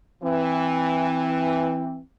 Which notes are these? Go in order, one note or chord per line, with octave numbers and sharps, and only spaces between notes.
E3 C4